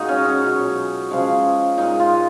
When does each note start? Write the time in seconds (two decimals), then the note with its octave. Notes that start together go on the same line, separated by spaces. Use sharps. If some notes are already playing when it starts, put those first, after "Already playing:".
Already playing: A#2 G#3 D#4 F#4 G#4 A#4
0.09 C#4
0.25 C#4
0.42 B2 F#3
1.11 C#3 F3 G#3
1.77 A#2 G#3 D#4
2.00 F4